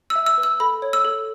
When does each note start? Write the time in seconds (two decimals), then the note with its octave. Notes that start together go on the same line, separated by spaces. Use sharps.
0.10 E6
0.15 E5
0.26 E6
0.38 B4
0.43 E6
0.60 A4 B5
0.82 C#5
0.93 E6
1.05 A4